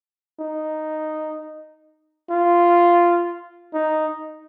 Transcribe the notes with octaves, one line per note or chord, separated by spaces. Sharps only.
D#4
F4
D#4